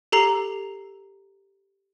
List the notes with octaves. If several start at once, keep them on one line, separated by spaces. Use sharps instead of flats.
G4 A4 A#5 C7